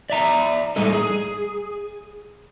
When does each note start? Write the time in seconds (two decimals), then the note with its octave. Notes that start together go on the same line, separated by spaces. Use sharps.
0.10 D5 E5 A#5
0.76 A2 G3 G#3 D#4 A4
0.93 G#4